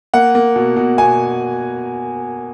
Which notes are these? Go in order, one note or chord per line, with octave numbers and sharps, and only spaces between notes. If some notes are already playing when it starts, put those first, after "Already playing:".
A#3 F#5
A#3
B2
B2
B2 G#5